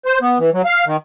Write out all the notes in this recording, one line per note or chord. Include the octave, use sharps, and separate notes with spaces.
C5
B3
E3
F#3
F5
D#3